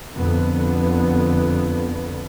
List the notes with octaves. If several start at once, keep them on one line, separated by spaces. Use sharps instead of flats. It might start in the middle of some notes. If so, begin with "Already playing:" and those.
F2 D3 B3